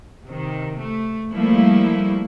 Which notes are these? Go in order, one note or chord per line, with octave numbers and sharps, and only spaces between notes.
C3 D#3
A3
F3 G3 A3 A#3 E4